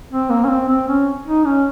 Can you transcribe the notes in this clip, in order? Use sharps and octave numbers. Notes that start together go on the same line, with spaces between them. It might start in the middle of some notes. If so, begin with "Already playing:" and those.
C4
A#3
C#4
C4
C4
C#4
D#4
C#4